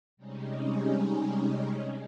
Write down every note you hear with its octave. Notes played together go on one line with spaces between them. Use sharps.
C3 G3 G#3 C#4 D#4